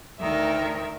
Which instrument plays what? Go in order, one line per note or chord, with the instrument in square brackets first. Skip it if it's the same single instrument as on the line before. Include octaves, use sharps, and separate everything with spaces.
[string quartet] D2 D#3 A#4 E5